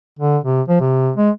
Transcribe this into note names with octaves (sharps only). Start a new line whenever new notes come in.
D3
C3
F3
C3
G#3